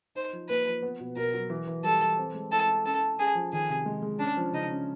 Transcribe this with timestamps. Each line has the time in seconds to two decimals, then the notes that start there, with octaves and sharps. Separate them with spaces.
0.15 D#4 C5
0.33 F3
0.49 A#3 B4
0.67 F3
0.83 B3
1.00 B2
1.16 B2 A#4
1.34 F#3
1.50 E3
1.67 E3
1.83 G3 A4
2.01 E3
2.18 C4
2.34 G#3
2.52 E4 A4
2.68 E4
2.85 C#4 A4
3.02 C#4
3.18 C#4 G#4
3.35 F3
3.53 D#3 G#4
3.69 C3
3.86 G#3
4.02 G#3
4.19 C#4 D4
4.37 F3
4.53 C#3 D#4
4.70 C#4